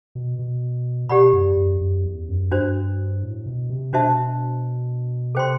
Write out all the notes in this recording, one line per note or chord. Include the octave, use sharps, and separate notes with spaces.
B2
B2
B2 G4 D5 F#5 B5
F#2
F#2
F#2
E2
F#2
G2 D4 F#4 C5
A2
B2
C3
B2 D4 F#4 C5 E5 A5
C3 A4 C5 G5 C6